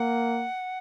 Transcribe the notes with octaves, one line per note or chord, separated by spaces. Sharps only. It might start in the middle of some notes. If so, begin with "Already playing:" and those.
Already playing: A#3 F#5